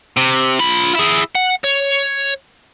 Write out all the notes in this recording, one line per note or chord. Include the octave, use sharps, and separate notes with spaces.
C3
F4 B5
E4 G#4
F#5
C#5